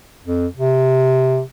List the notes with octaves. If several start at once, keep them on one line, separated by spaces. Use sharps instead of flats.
F2
C3